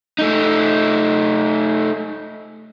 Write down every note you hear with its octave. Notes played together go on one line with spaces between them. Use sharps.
A3 D#4